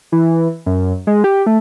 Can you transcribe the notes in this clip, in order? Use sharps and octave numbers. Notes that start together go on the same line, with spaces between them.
E3
F#2
G#3
G4
A3